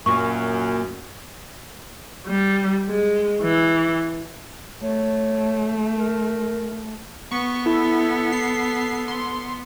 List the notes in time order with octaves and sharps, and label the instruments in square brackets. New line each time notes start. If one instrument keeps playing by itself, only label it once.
[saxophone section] F#2 [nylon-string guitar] A#2 [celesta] C#6
[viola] G3
G#3
E3
[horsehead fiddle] A3 [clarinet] C#5
[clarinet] A#4
[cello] B3 [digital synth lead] C#6
[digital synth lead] E4 [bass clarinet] A4
[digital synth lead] C7
C6